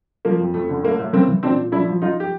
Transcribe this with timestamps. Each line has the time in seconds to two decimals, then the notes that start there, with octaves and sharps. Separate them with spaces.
0.25 F3 A#3
0.40 F2
0.54 F2 A3
0.69 D3
0.83 A2 A#3
0.99 A2
1.13 E3 A#3 C4
1.28 E3
1.43 A#2 C4 D4
1.58 A#2
1.72 F3 D4 E4
1.87 F3
2.01 F3 D#4 F4
2.20 G4